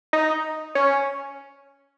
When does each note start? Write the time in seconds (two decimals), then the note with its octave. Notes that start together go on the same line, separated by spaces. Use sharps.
0.13 D#4
0.75 C#4